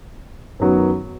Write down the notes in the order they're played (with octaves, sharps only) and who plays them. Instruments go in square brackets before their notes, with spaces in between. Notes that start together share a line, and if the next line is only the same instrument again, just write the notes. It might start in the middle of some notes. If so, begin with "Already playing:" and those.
[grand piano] F#2 D#3 F#3 B3 F#4